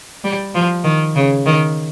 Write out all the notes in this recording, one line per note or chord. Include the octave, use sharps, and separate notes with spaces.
G3
F3
D#3
C#3
D#3